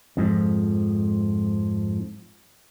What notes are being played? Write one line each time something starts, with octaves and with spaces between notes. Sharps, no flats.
F2 G#2 F3